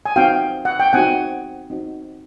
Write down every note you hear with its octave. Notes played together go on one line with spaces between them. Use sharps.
G#5
C4 D#4 F#4 F5 G5
F#5
G5
C4 D#4 F#4 F#5 G#5
C4 D#4 F#4